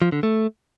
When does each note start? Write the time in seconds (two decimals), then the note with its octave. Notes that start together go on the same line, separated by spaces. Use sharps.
0.02 F3
0.12 D3
0.23 A3